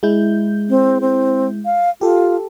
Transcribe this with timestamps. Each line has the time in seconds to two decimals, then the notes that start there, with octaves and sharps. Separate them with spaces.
0.03 G#3 E4 G6
0.69 C4
1.01 C4
1.65 F5
2.01 F4 G4 A4